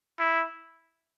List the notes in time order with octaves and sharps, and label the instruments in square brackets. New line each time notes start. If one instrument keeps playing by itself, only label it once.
[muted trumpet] E4